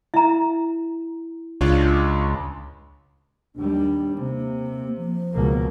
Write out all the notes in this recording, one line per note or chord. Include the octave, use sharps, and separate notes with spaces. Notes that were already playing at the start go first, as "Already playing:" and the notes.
E4 E5 A#5
C#2 D4 F4 C#5
D#2 G3 D4
C3 A#3
F3
C#2 B2 A#3